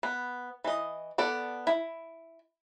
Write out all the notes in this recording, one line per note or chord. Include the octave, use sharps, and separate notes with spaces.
B3
E3 D#5
B3 A4 D5
E4